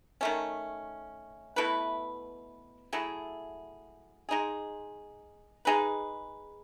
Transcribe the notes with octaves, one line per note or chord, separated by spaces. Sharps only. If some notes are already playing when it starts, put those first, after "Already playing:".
D#3 A3 C#4
B2 A3 E4 B4
F#3 A3 E4 G#4
G#3 D#4 G#4
G#3 D#4 G#4 B4